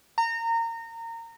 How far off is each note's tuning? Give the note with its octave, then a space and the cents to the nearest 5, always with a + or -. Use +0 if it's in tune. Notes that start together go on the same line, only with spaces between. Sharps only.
A#5 -25